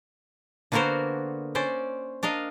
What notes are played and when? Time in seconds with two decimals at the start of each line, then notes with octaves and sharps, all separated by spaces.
0.72 D3 A#3 B3 F#4 A#4 C5
1.55 C#4 C5 D5
2.23 D4 A#4 D#5 F5